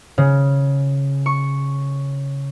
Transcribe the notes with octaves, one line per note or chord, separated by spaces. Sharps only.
C#3
C#6